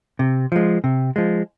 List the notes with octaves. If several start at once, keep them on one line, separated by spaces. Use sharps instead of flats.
C3
F3 G#3
C3
F3 G#3